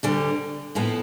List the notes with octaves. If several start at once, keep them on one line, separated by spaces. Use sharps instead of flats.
D2 D3 G3
A2 F3 B3 E4 A4